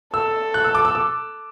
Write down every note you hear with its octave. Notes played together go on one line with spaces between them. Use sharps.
A4 E6
F#6
E6
D6
E6
D6